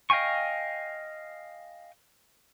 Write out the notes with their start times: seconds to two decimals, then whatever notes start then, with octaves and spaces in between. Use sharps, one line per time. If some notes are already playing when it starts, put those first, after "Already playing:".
0.10 D#5 F5 G5 G#5 C#6